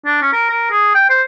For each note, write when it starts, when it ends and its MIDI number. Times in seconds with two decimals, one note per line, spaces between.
0.06 0.18 62
0.22 0.30 61
0.33 0.49 70
0.50 0.69 70
0.71 0.91 68
0.95 1.06 79
1.10 1.22 72